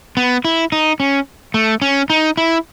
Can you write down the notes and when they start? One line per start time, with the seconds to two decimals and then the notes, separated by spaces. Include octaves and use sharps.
0.17 B3
0.45 E4
0.72 D#4
1.00 C#4
1.54 A3
1.82 C#4
2.10 D#4
2.37 E4